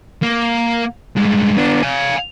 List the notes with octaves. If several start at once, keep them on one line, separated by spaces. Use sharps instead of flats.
A#3
G2 G#3
B3 D4
F5 G#5